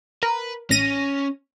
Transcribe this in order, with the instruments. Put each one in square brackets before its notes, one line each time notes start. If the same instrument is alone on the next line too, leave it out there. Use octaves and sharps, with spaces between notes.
[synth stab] A#4 [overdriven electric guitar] B4
[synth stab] A1 A#6 D#7 [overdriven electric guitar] C#4